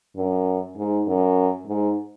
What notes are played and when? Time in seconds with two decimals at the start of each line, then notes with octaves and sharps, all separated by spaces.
0.16 F#2
0.77 G#2
1.07 F#2
1.67 G#2